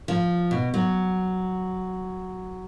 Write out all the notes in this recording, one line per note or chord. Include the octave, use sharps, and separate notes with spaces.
F3
B2
F#3